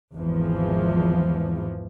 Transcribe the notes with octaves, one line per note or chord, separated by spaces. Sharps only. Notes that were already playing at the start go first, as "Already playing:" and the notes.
G#1 E2 E3 F3